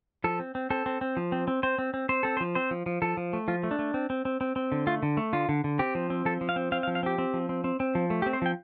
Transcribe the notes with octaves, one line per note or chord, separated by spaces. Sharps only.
F3 A4
C4
C4
C4 A4
C4
C4
F3
C4
C4
C4 C5
C4
C4
C4 C5
C4 A4
C5
F3
C4 C5
F3
F3
F3 A4
F3
A3
F3 F4
A3
D4
A3
C4
C4
C4
C4
C4
D3
A3 F4
D3
A3
D3 F4
D3
D3
C4 G4
F3
C4
F3 A4
F3
F5
C4
C4 F5
F5
F3
F5
C4 G4
C4
F3
C4
C4
C4
F3
A3
G4
C4
C5
F3 G5